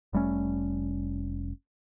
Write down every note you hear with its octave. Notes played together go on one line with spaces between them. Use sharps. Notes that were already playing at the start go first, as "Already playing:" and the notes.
F1 G3 A3 C#4